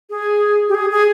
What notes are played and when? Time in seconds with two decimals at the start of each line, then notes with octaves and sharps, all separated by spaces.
0.10 G#4
0.69 G4
0.75 G#4
0.91 G#4